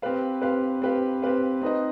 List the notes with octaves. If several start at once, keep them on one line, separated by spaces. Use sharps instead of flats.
C4 G4 B4 F5
C4 G4 B4 F5
C4 G4 B4 F5
C4 G4 B4 F5
C4 D#4 B4 D#5